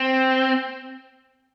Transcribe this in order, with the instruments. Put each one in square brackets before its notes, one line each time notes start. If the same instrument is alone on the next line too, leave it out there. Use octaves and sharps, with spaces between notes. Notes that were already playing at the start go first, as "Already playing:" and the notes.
Already playing: [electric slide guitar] C4